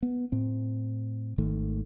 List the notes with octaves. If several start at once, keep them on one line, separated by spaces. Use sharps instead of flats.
B3
A2 C4
G#1 D#3 A3